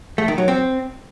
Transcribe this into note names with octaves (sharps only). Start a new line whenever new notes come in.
A3
D#3
F#3
C4